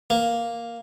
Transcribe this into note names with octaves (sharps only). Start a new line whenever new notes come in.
A#3